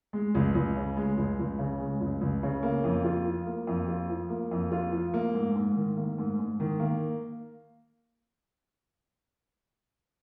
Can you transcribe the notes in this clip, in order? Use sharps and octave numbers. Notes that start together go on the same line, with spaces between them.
G#3
C#2
C#2
C#3
G#3
C#2
C#2
C#3
G#3
C#2
C#2
C#3
A#3
F2
F4
F3
A#3
F2
F4
F3
A#3
F2
F4
F3
A#3
G#2
G#2
D#3
A#3
G#2
G#2
D#3
A#3